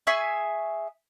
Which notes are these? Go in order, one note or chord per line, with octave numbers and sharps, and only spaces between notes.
G#4 E5 G#5 C#6